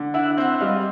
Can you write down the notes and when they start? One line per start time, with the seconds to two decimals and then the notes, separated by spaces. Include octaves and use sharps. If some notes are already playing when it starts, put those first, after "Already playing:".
Already playing: D3
0.14 E4 E5 F#5
0.37 C4 E5 F#5
0.61 G3 D#5 F5